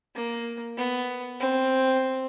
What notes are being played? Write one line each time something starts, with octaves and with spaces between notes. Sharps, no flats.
A#3
B3
C4